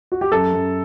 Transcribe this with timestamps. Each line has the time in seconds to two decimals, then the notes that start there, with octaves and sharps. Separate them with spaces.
0.12 F#4
0.21 G4
0.32 F#2 A4
0.53 F#2